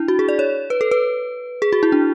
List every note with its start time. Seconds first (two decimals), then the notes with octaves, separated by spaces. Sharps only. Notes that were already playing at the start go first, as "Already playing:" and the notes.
Already playing: D4 E4
0.08 F#4
0.19 G#4
0.29 D5
0.39 C#5
0.70 B4
0.81 A4
0.91 B4
1.62 G#4
1.73 F#4
1.83 E4
1.92 D4